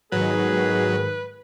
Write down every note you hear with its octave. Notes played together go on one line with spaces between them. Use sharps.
G#2 D#3 F#3 B3 F#4 G#4 B4